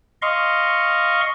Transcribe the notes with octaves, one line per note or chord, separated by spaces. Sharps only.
D#5 F5 C6 C#6